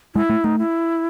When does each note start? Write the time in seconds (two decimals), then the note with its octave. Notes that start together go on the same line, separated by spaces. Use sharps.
0.15 G#3 E4
0.30 A3
0.44 A3 D#4
0.59 E4